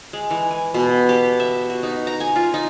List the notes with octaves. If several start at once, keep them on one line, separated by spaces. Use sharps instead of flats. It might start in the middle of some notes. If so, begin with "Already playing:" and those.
G#3
E3
G#5
B2
G4
E5
F#4
D#4
A#5
G#5
F4
D#4